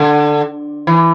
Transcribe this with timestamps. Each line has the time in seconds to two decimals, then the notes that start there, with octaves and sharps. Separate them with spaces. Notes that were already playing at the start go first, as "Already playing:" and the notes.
Already playing: D3
0.87 E3